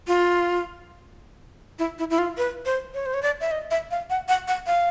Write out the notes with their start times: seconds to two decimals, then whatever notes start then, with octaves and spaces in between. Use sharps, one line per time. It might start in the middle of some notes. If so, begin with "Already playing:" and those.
0.07 F4
1.79 E4
1.99 E4
2.10 E4
2.18 F4
2.37 B4
2.65 C5
2.94 C#5
3.06 C5
3.14 C#5
3.22 D5
3.41 E5
3.51 D#5
3.71 E5
3.91 F5
4.10 F#5
4.28 F#5
4.48 F#5
4.67 F5